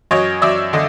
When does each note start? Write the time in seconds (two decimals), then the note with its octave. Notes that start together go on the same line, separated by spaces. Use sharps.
0.11 F#2 C#5 D#5
0.42 F#2 D5 E5
0.73 D3 D#5